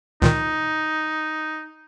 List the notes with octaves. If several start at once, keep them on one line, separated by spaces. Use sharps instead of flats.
C#2 A#2 D#3 D#4